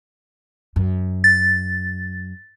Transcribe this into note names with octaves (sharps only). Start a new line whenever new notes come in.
F#2
A6